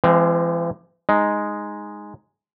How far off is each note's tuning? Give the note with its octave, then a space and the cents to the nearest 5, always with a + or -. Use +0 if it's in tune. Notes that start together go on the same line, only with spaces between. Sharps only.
E3 +45 G#3 +0 C4 +0
G#3 +0 D#4 +0